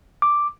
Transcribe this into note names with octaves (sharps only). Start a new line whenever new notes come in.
D6